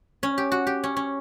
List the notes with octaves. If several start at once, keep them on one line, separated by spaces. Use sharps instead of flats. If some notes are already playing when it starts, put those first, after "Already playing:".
C#4
G4
F#4
G4
C#4
C#4